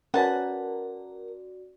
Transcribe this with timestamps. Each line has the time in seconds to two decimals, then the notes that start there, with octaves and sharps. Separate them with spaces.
0.14 C#4 F#4 A#4 B4 D5 F#5 G#5 A5